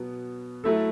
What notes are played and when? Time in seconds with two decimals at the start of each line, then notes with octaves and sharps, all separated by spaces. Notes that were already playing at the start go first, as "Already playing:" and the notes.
Already playing: B2 F#3 B3
0.64 F#3 A3 E4 A4